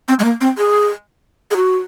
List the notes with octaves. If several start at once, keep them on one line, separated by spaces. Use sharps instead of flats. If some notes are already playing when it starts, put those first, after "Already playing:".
C4
G#3
A#3
C4
G#4
G#4
F#4